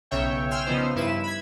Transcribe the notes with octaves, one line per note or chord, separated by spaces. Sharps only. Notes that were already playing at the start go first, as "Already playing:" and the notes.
B1 C#3 C#5 E5 G5
G5 G#5 C6 E6 F6
C#3 F3 B3 D#4 C5
G2 E4 B4 E7
B5 G#6